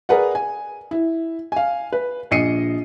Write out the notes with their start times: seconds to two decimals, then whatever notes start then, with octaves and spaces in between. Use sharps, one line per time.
0.09 G#4 A#4 B4 D5 F#5
0.35 G#5
0.91 E4
1.52 F5 G#5
1.92 B4
2.31 A#1 D#5 C7 C#7 D#7